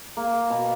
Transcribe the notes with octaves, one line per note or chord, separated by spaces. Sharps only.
A#3
B2